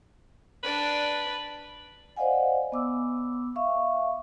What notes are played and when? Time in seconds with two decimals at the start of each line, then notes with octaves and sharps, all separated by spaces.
0.63 D4 B4 D5
2.17 C5 D5 D#5 F5 F#5 G#5
2.72 B3 D6 E6
3.56 E5 F5 C#6